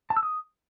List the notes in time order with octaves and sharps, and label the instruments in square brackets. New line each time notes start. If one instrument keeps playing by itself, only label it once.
[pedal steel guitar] A5
E6
D#6